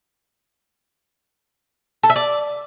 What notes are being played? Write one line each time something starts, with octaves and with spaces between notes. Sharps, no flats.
A4
E5
D5